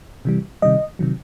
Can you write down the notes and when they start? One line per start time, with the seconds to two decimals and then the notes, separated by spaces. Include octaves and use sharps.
0.25 C3 E3 G3
0.62 C3 D#3 G3 D#5
0.99 C3 D#3 F#3